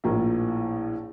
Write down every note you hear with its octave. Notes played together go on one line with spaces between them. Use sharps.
A#1 A2 F3 A#3